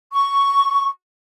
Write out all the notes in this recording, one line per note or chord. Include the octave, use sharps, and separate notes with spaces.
C#6